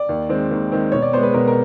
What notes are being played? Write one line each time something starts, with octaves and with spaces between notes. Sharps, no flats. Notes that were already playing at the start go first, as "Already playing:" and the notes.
Already playing: D5
D#2
D#3 G#3 C4
D#2
D#3 G#3 C4
B2 C#5
D5
G#3 B3 C5
B4
B2 A#4
A#4